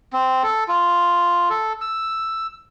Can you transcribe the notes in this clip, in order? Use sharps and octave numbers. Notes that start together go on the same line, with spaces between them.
C4
A4
F4
A4
E6